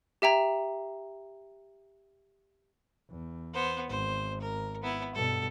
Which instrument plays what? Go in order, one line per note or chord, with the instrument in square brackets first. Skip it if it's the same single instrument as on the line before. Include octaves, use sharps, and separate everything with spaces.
[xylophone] G4 E5 G5 A#5
[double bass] E2
[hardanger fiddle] B3 C5
[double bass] G#1 [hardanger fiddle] C5
[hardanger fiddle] A#4
B3 E4
[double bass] G2 B2 [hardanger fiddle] A4